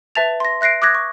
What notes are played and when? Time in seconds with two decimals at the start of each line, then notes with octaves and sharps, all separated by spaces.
0.15 B4 E5 A5 A6 F7
0.40 C6 A#6
0.61 E5 F#6 A#6 C7 D7
0.82 D6 D#6 F#6 G#6 A#6
0.95 C#6